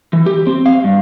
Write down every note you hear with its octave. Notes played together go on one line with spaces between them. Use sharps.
E3
G4
C4
F5
G2